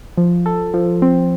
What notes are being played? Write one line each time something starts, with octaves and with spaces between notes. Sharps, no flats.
F3
A4
F3
C4